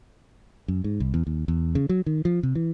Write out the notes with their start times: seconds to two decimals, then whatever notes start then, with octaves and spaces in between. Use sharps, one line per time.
0.68 F#2
0.84 G#2
1.00 C2
1.14 E2
1.27 D#2
1.48 E2
1.75 C#3
1.89 F#3
2.06 D#3
2.25 F3
2.43 C3
2.55 E3